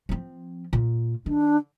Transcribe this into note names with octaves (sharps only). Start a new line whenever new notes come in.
F3 C4
A#2
D#3 D4